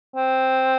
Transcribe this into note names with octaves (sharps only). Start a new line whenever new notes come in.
C4